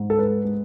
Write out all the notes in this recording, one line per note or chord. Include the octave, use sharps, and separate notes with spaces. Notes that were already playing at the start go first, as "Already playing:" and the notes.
Already playing: G#2
A4
G#3 B4
G#3